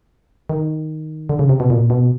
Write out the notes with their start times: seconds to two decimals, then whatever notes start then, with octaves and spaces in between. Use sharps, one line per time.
0.49 D#3
1.29 D3
1.39 C#3
1.49 C3
1.60 B2
1.70 A#2
1.90 B2